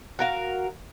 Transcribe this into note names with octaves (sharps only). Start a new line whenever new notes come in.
F#4 A#4 F5